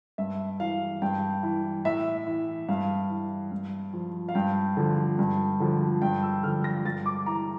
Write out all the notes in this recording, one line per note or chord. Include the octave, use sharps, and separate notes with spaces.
G2 E5
E3 F5
G2 G5
E3
A2 E5
E3
G2 F5
E3
G2
F3
F5
G2 G5
D3 F3
G2
D3 F3
G2 G5
E6
D3 F3 F6
A#6
G2 A6
D6
E3 A#5